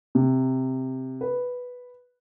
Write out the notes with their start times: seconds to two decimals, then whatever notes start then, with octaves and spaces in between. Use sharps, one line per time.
0.15 C3
1.21 B4